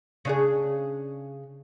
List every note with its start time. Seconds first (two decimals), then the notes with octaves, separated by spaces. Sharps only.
0.25 C#3 D4 G#4